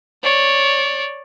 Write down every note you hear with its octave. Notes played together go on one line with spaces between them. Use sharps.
C#5 D5